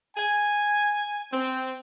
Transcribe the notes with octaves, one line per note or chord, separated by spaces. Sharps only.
G#5
C4